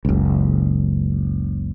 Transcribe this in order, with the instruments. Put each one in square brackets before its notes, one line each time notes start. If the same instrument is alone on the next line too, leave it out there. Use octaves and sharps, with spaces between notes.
[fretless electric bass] F#1 C#2